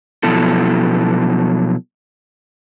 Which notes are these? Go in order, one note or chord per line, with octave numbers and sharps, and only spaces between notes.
B2 F3 F#3 B3 E4 A4